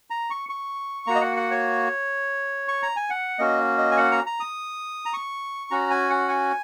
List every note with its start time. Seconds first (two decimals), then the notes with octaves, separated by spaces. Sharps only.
0.10 A#5
0.30 C#6
0.49 C#6
1.07 A#3 F#4 A#5
1.15 D#5
1.21 F#5
1.36 F#5
1.51 C#5
2.68 C#6
2.82 A#5
2.96 G#5
3.10 F#5
3.39 A#3 C#4 F#4 D#5
3.78 D#5
3.91 G#5
3.97 F#5
4.11 A#5
4.26 A#5
4.40 D#6
5.06 A#5
5.13 C#6
5.71 C#4 F#4 A#5
5.90 G#5
6.10 F#5
6.28 G#5